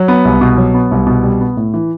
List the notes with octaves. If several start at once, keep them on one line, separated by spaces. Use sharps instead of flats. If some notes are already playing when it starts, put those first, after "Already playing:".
Already playing: F#3
B3
C2
B2
F#3
B3
C2
B2
G3
B3
A2
E3